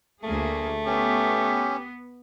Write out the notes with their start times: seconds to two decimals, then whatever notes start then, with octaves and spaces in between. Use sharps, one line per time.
0.23 D2 A3 A#3 G#4
0.86 B3 C#4 G4